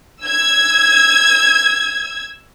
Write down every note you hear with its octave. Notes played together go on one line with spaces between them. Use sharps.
E6 G#6